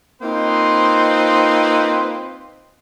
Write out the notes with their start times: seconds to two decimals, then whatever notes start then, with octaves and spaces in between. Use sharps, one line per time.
0.22 A#3 C4 D#4 F4 B4 C5